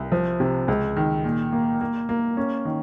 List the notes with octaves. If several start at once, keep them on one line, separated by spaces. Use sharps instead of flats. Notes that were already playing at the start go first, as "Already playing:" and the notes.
Already playing: C2
F3
C3
C#2
D#3
A#2
A#3
A#3
A#3
C#4
D#3